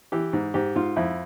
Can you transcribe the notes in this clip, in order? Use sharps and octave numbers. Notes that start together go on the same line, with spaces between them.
E3 G4
G#2
G#2 G4
G#2 F4
F2 E4